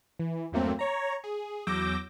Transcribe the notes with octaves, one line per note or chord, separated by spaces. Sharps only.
E3
E2 G2 F#3 A3 A#3 C4
C#5 A#5
G#4
E2 F#3 D6 E6 G6 A#6